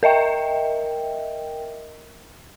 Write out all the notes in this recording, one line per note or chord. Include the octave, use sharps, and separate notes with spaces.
A#4 D#5 E5 G5